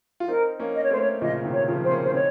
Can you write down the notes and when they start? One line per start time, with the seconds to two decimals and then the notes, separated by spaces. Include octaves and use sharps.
0.20 F4
0.28 C4 D#4 A#4
0.60 A#3 C#4
0.75 D#5
0.84 C#5
0.91 A3 C4 C5
1.01 C#5
1.21 A#2 C#3 D#5
1.44 C3 D#3
1.53 C#5
1.68 C#3 F3
1.84 C4 C5
1.91 A#3 C#4
2.04 C5
2.10 C#4
2.14 C4 D#4 C#5